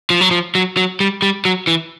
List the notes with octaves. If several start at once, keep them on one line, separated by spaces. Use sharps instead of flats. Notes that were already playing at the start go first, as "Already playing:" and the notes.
F3
F#3
F3
F#3
F#3
G3
G3
F#3
E3